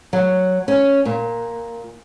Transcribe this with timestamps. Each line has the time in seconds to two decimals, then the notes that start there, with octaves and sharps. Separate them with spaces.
0.13 F#3
0.68 C#4
1.05 A#2